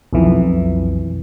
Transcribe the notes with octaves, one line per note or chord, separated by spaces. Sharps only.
B1 F2 E3